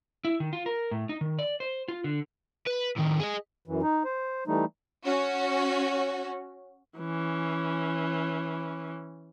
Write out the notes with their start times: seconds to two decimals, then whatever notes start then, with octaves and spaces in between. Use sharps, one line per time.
0.25 E4
0.40 D#3
0.53 F4
0.66 A#4
0.91 A2
1.09 D#4
1.21 D#3
1.39 D5
1.60 C5
1.88 F4
2.04 D3
2.66 B4
2.97 A2 D#3
3.20 G#4 D#5
3.68 F#2 E3
3.83 D#4
4.04 C5
4.47 E3 G3 A3 D#4
5.06 C#4 F#4
6.99 E3 C#4